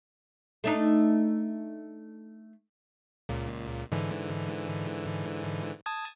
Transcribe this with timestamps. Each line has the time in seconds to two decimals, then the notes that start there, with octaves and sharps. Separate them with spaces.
0.64 A3 D4 D#4
3.29 C#2 A#2
3.92 G#2 D3 E3
5.86 A5 D#6 G#6